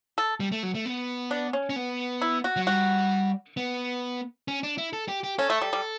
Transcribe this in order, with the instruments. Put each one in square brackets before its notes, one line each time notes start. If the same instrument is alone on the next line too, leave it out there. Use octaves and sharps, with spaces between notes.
[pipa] A4
[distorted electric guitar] G3
A3
F#3
A3
B3
[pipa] D4
C#4
[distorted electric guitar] C#4
B3
[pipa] E4
F#4
[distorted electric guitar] F#3
[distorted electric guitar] G3 [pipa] F#4
[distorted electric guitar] B3
C#4
D4
E4
A4
G4
G4
[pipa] C#4 [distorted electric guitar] A4
[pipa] A3
G3
G3